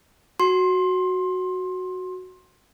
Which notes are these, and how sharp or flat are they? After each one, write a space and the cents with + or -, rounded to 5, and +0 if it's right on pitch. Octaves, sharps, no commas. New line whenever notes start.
F#4 +0 C6 +20